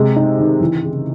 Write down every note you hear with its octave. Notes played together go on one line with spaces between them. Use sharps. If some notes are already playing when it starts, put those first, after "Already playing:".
Already playing: C3 G#3
D#4
D#3
E3
C#3